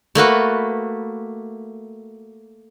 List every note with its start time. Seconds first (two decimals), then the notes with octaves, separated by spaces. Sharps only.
0.15 A3 A#3 F#4 B4